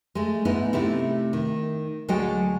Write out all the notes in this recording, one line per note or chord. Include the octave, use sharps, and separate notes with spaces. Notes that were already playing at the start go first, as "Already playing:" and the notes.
G#3 A3
G#2 B3 D#4 E4
C3 A3 D#4 E4
D#3
D2 F#3 G#3 A4 D#5 G5